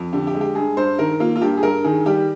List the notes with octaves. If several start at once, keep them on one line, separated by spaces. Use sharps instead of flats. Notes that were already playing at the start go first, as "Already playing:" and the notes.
Already playing: F2
D3 G4
G4
G#3
G4
G2 G#4
G2 C5
D#3 A#4
A#3 F4
F4
G2 G4
G#4
G2 A#4
D#3 G#4
G3 G4